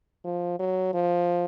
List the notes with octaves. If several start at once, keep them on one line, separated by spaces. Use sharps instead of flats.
F3
F#3
F3